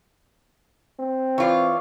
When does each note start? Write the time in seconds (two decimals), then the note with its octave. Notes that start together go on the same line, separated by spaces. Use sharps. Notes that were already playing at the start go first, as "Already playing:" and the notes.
0.99 C4
1.38 E3 F4 C#5 D5